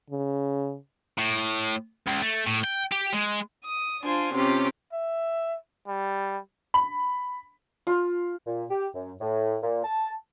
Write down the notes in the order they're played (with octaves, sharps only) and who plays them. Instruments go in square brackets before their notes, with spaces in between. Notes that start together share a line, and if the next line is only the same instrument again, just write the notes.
[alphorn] C#3
[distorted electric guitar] A2
C#2
A3
A2
G5
G4
G#3
[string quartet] D#6
D4 F4 C5 G#5
C3 C#4 F4 G4
[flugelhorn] E5
G3
[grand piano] B5
[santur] F4
[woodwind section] A#2
G4
F#2
A2
A#2
A5